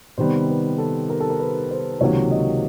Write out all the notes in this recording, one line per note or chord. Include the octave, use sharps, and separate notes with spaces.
C3 D#3 G3 B3 C5
B4
A4
A#4
A4
A#4
B4
C5
C#2 C3 D#3 F#3 A#3 C#5
D#5